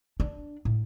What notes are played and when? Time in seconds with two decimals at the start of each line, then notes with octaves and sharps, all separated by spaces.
0.20 D4
0.65 A2